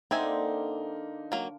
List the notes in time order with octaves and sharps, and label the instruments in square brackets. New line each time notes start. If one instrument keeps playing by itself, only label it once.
[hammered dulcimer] D3 A#3 C6 [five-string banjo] C4 E5 G#5 [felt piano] D#4
[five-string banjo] F#3 A#3